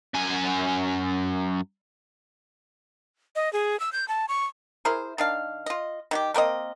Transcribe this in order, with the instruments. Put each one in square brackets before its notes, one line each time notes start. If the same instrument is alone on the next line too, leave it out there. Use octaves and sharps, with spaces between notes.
[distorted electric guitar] F#2 G#5
[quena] D#5
G#4
E6
G6
A5
C#6
[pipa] E4 G#4 A#4 C5
D#3 D4 F5
F4 D#5
D#3 F#4 G4
A3 A#3 C4 D#5